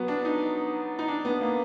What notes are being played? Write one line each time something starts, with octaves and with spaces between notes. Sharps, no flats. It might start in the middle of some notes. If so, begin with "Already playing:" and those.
Already playing: F#3 B3
D4
D#4
D#4
D4
B3
A#3